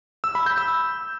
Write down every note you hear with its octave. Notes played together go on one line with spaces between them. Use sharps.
E6
B5
G6
E6